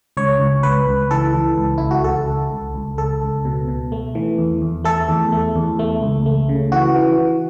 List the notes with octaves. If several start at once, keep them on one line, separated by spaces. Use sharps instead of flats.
C#2 C#5
C#2
C#2 B4
C#2
E3 A4
E3
C#2
C#2 E4
F#4
C#2 A4
C#2
C#2
C#2
C#2 A4
C#2
B2
B2
A3
E3
E2
E2
A3 A4
E2
A3
E2
A3
C#2
A3
C#3
E3 F#4
E3
E3